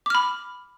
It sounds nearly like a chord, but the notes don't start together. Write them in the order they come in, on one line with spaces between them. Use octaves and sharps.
D6 F6 B5